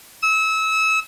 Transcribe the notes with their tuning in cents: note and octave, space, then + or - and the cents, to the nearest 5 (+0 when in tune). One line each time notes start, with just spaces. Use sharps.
E6 -30